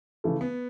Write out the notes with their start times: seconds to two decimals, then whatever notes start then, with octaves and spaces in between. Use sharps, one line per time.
0.24 C#3 E3 A3
0.41 B3